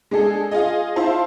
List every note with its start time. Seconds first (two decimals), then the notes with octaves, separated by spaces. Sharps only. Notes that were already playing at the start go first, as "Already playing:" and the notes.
0.11 G#3 D4 G#4 A4
0.51 F4 G#4 D#5
0.96 E4 F4 C5 A5